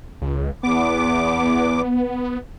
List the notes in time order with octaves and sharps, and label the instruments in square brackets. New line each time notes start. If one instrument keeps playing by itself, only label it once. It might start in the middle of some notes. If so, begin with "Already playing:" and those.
[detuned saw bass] C#2
[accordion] E2 D6 [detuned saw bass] B3